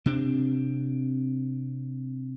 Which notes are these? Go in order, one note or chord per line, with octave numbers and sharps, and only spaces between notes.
C3 C4 D4